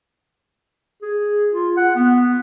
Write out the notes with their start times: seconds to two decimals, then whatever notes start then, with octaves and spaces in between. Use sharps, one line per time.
1.02 G#4
1.52 F4
1.77 F#5
1.96 B3